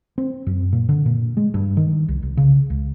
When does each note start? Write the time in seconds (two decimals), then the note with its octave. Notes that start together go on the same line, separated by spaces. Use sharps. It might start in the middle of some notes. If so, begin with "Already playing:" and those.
0.18 C4
0.47 F#2
0.73 A#2
0.89 D3
1.06 A#2
1.37 G#3
1.54 G2
1.77 D#3
2.08 C2
2.23 C2
2.37 C#3
2.70 C#2